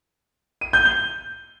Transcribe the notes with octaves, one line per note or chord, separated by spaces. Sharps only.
D#7
G6
G7